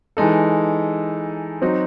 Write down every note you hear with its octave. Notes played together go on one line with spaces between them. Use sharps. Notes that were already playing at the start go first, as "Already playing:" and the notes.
E3 G#3 D#4 A4
F#3 C4 D#4 F#4